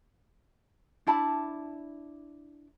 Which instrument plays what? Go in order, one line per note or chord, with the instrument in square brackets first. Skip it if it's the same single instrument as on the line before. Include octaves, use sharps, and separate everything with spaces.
[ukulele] D4 E4 A5 B5